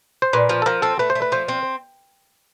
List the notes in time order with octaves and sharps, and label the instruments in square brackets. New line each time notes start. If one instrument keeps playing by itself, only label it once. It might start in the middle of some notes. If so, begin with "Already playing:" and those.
[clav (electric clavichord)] C5
[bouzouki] A#2 [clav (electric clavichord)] B4
[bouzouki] F3
[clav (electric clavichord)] A4
[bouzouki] F3 [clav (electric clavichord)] A#4
[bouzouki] C4 [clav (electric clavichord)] A4
[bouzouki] A3 [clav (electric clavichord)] B4
[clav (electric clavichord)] C5
[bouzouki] A3
[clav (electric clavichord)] B4
[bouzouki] F3 [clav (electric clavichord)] C5
[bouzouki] C4